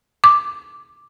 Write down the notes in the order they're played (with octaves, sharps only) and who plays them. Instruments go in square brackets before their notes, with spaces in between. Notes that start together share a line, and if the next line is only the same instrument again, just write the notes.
[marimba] D6